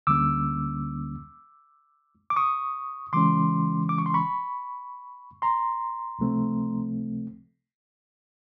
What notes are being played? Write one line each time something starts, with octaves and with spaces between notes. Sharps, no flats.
D2 D3 G3 A#3 C#4 D6 E6
D6
C#6 D#6
C#3 E3 G#3 C#4 C6 D6
D6
C#6
C6
B5 C#6
A#5 C6
C#2 C3 F3 A3 C4